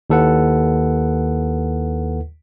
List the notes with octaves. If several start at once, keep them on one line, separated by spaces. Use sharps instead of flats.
D#2 E4 A4 B4 F#5